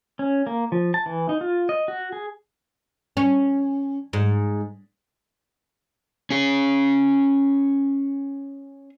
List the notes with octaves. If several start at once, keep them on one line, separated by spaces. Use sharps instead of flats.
C#4
A#3
F3
A5
E3
D#4
F4
D#5
F#4
G#4
C#4
G#2
C#4 G#4